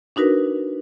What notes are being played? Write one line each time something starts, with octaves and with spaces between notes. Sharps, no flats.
D4 D#4 F#4 A#4 B4